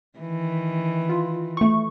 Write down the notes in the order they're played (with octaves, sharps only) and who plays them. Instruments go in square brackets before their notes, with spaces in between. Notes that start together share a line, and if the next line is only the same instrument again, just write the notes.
[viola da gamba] D#3 E3
[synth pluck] F4
A3 C#6